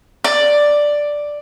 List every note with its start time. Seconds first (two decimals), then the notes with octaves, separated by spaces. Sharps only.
0.24 D5